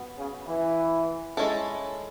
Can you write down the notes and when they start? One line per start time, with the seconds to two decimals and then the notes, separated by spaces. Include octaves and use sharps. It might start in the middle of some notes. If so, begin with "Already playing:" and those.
Already playing: B3 F#4
0.18 C#3
0.47 E3
1.37 G#3 C#4 E4 A4